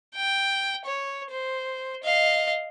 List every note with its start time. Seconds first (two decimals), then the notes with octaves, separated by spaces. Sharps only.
0.16 G5
0.86 C#5
1.30 C5
2.04 D#5 F5